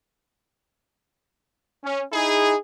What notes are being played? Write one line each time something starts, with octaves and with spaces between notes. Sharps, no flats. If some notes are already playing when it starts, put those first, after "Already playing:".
C#4
D#4 E4 G#4